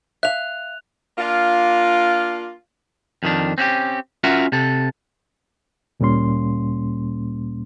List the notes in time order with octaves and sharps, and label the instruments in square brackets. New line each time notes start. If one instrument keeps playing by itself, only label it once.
[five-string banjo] E5 F5 [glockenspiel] F#6 F7
[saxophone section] A#3 D4 F4
[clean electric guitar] F2 D#3 D4
C4 C#4 F#4 G4
C#4 F4 F#4 A#4 E5 F#5
C3 A4
[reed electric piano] D2 A#2 G3 A#3 C#4 C6